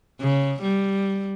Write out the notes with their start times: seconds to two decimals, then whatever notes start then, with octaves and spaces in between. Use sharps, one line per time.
0.21 C#3
0.62 G3